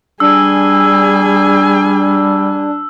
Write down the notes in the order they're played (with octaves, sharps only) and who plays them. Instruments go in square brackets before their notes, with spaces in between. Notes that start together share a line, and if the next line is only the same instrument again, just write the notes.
[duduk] G3 [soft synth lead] D4 [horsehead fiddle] G#4 G#5 [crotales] E6